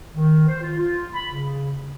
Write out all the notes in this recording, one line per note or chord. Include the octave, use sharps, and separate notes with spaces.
D#3
C5
F4
F4
B5
C#3